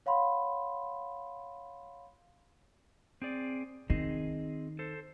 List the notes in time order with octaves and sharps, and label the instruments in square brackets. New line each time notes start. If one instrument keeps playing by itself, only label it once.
[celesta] C#5 F5 F#5 B5 C6
[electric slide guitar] C4 G#4 D5
[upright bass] D#3 D#4 [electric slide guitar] C4 G#4 D#5
[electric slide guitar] A4 C5